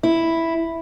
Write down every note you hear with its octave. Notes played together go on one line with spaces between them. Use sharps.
E4